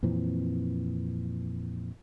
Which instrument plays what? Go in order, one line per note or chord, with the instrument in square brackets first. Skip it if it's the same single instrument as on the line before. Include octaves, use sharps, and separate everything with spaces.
[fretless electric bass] F2 A#2 E3 C4